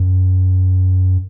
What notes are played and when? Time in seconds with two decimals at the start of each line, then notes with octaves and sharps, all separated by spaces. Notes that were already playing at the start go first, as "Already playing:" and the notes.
Already playing: F#2